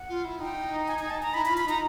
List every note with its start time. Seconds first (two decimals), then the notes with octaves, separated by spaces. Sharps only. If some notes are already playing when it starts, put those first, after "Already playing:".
Already playing: F#5
0.09 F4
0.25 E4
0.40 D#4 G5
0.88 G#5
0.99 G#5
1.10 A5
1.23 A#5
1.34 E4 B5
1.46 B5
1.50 F4
1.57 B5
1.65 D#4 A#5